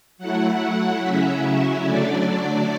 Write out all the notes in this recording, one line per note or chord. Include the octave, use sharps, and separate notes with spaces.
F#3 A3 E4 F#5
C#3 F#3 C#4 E4 E5
E5
D3 F#3 A3 D4 D5